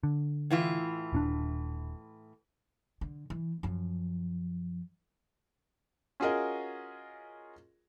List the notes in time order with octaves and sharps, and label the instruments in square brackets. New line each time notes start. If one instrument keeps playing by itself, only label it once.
[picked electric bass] D3
[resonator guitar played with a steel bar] A2 E3 F4
[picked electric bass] D#1 C#4 D4
[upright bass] D3
E3
F#2 F3
[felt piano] C#4 F4 F#4 G#4 A#4 D#5